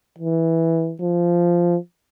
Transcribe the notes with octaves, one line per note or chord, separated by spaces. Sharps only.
E3
F3